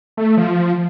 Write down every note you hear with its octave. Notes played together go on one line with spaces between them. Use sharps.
A3
F3